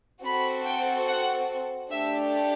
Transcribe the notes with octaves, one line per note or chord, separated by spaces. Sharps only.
C4 F#4 A4 B5
G5
F#5
A3 D4 G4 E5